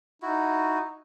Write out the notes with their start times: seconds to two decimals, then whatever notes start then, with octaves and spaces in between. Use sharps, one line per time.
0.22 D#4 E4 F#4